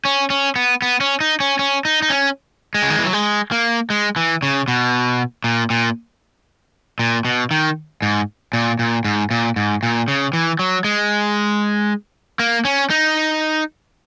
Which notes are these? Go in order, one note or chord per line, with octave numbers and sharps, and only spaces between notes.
C#4
C#4
B3
B3
C#4
D#4
C#4
C#4
D#4
D#4
C#4
G#3
C#3
D#3
E3
F#3
G#3
A#3
G#3
E3
C#3
B2
A#2
A#2
A#2
B2
D#3
G#2
A#2
A#2
G#2
A#2
G#2
A#2
C#3
E3
F#3
G#3
A#3
C#4
D#4